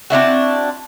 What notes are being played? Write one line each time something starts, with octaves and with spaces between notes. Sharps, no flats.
C4 D4 E4 F#4